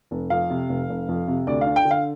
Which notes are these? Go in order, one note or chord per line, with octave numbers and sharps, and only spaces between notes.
F1
F2 F5
C3
F1
F1
F2
C3
D2 D5
F5
D4
G5
D3
F5